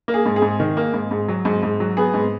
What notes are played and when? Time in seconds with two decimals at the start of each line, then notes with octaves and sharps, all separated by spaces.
0.08 A#3
0.14 G#4
0.26 G#2
0.36 G#4
0.42 G#2
0.60 D#3
0.77 A#3
0.93 G#2
1.11 G#2
1.28 F#3
1.45 G#2
1.63 G#2
1.80 F#3
1.97 B3 G#4
2.14 G#2